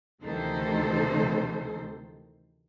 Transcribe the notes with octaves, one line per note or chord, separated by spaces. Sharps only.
D2 C3 D#3 E3 A4 C5